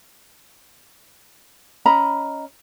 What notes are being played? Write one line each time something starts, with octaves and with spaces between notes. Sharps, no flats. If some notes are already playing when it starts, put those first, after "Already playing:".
C#4 D#5 A#5 B5